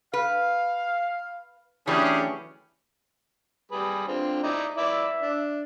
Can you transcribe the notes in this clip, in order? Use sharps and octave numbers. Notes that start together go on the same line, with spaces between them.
B4 F5
E3 F#3 A3 C#4 D4 G4 G#4
G3 G#4 B4
D3 C4 F4
D#4 E4 D5
E4 B4 D5 E5
D4